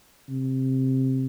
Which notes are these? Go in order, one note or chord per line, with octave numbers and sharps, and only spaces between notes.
C3